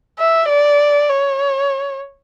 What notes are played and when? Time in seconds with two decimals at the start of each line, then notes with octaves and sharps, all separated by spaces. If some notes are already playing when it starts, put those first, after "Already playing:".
0.19 E5
0.49 D5
1.09 C#5